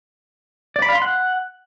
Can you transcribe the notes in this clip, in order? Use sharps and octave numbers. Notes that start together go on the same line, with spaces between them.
D5
B5
F5
C6
F#5